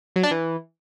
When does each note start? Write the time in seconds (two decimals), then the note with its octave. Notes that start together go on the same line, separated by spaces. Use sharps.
0.16 F#3
0.23 D4
0.31 E3